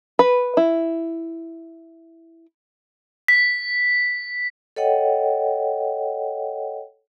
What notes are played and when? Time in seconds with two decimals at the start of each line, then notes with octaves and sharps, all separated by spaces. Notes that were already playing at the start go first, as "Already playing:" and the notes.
0.19 B4
0.57 E4
3.28 B6
4.76 A4 C#5 D#5 F#5 G5